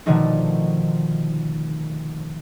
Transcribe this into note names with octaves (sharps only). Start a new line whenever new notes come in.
B2 D3 D#3 F3 A3 D#4